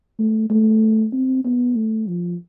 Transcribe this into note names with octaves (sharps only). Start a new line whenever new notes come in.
A3
A3
C4
B3
A3
F3